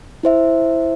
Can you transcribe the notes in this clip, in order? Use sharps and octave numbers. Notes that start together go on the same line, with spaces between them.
E4 C5 E5